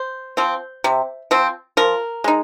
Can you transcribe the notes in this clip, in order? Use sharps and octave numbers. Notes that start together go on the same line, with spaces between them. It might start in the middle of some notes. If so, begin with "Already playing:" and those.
Already playing: C5
F3 C4
C3
F3 C4
F3 A#4
G#3 D#4